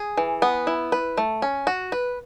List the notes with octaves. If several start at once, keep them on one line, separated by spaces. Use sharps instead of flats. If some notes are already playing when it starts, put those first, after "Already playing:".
Already playing: G#4
E3
B3
E4
B4
A3
C#4
F#4
B4